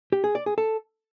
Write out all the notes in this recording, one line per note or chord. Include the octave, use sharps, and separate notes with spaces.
G4
G#4
D5
G#4
A4